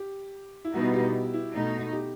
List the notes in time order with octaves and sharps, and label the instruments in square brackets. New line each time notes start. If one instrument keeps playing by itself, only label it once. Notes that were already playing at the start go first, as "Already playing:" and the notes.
Already playing: [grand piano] G4
E4
[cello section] B2 G3 B3 D#4 [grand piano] F#4
[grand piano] G4
E4
[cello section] B2 A3 D#4
[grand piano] G4